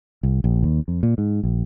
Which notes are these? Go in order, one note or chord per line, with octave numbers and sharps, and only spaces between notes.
C2
A#1
D#2
F2
A#2
G#2
A#1